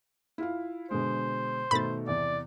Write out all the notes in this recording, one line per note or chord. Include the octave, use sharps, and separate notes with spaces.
E4 F4 F5
B2 D3 G#3 C5
B2 D#3 A3 B5 A6
E2 C3 D5